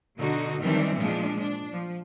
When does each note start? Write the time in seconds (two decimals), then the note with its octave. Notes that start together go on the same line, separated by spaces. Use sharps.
0.17 B2 D3 D#4 F#4
0.62 D#3 E3 F#3 G3 C4 D4
0.96 A#2 F3 G#3 D4
1.41 D4
1.72 F3